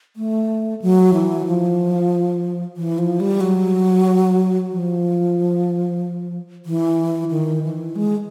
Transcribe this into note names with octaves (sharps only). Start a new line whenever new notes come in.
A3
F#3
E3
F3
E3
F3
G3
F#3
F3
E3
D#3
E3
G#3